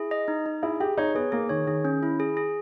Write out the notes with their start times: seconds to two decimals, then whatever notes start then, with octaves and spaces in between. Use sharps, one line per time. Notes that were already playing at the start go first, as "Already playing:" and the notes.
Already playing: E4 G#4
0.11 D#5
0.28 D#4
0.46 D#4
0.63 E4 G#4
0.80 G4 G#4
0.98 D#4 C#5
1.15 B3 G#4
1.32 A#3 G#4
1.49 D#3 C#5
1.67 D#3 G#4
1.85 C#4
2.03 E4
2.20 G#4
2.37 G#4